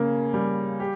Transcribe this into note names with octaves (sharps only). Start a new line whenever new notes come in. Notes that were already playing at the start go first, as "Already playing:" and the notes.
Already playing: C#3 A#3 C#4
G3
G4